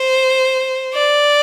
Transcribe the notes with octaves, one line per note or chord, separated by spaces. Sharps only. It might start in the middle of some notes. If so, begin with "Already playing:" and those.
Already playing: C5
D5